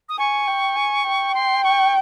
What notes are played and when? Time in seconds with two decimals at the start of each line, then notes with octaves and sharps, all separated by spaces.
0.09 D#6
0.19 G#5 C#6
0.48 G5
0.76 G#5
1.06 G5
1.35 C6
1.64 C#6